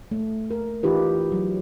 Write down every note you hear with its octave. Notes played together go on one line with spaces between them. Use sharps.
A3
A#4
E3 D#4 F4 G4 B4
F#3